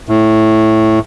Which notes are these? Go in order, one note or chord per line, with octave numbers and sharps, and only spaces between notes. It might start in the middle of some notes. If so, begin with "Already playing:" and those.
A2